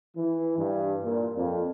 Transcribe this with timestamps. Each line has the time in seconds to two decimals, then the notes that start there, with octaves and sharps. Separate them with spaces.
0.16 E3
0.58 G2
1.04 A#2
1.36 F2